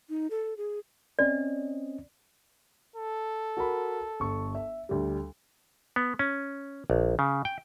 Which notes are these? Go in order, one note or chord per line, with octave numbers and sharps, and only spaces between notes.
D#4
A4
G#4
C4 C#4 D5 D#5
A4
F#4 A#4 B5
G1 C#6
E5
D2 G3
B3
C#4
A#1
C#3
G5